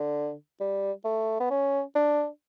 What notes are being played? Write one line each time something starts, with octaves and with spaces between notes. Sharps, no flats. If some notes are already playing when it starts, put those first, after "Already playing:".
Already playing: D3
G3
A3
B3
C#4
D4